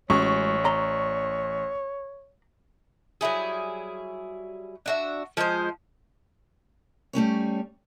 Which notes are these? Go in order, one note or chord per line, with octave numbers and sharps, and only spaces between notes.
A1 G#3 C#4 F#4 C#5 C#6
D5 A#5 C6
F#3 G3 E4 G#4
D4 F#4 E5
F3 G#3 D4 C5
G3 A3 C#4 C#5